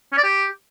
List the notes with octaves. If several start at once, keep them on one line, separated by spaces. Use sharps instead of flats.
C#4
D5
G4